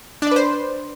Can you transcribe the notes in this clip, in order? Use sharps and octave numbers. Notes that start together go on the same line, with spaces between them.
D4 B4 C5 D5